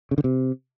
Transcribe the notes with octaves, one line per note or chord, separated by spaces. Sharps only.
C#3
D3
C3